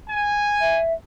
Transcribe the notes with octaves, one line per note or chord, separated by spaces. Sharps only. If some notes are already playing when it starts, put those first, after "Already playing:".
G#5
E5